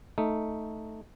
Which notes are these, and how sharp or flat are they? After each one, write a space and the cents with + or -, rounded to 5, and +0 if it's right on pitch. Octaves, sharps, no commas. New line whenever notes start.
A3 +0 D#4 +0